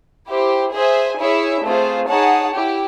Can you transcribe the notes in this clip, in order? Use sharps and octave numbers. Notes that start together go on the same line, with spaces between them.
E4 G4 C5
G#4 C5 E5 G#5
E4 G#4 C#5 E5
A3 C4 F4 G#4 C5
D#4 G#4 C#5 F#5 A5
E4 G4